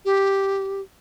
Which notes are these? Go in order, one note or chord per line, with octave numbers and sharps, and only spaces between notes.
G4